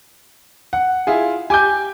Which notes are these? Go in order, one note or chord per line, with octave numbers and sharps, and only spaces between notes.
F#5
E4 F4 G#4
G4 G#5 D6 G6